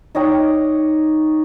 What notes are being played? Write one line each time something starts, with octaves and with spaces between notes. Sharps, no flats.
D#4 C#5 D#5 G5